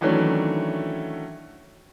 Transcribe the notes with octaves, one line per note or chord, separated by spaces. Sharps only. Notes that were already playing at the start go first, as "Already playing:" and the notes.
D#3 E3 F#3 A3 C#4 D4